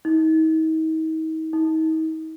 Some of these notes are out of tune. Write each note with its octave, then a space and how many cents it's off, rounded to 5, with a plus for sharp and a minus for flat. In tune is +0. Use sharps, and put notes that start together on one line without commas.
D#4 +40
D#4 +40